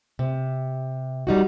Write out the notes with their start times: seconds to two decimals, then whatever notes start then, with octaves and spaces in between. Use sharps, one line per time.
0.19 C3
1.27 G3 D#4 F#4